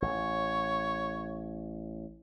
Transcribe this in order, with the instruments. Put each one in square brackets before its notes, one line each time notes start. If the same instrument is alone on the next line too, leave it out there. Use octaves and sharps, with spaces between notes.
[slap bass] A1 [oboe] C#5